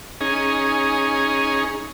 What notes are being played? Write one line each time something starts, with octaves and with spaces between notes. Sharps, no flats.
C#4 D#4 G#4